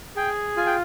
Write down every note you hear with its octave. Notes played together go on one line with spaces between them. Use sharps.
G#4 G5
F4 G#5
G5